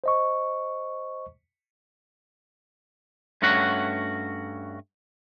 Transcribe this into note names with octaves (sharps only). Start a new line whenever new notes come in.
C5 D#5 C#6
G2 A3 C#4 F#4 F#5